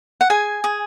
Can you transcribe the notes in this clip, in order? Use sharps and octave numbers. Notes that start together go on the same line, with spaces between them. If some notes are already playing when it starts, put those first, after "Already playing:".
F#5
G#4 G#5
G#4